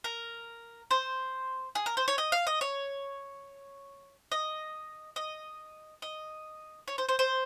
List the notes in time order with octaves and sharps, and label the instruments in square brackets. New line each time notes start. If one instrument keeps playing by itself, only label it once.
[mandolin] A#4
C5
G#4
A#4
C5
C#5
D#5
F5
D#5
C#5
D#5
D#5
D#5
C#5
C5
C5
C5